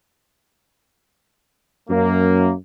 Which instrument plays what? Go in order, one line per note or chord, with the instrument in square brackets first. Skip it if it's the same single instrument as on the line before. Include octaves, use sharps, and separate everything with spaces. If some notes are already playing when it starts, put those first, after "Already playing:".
[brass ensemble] F#2 A#3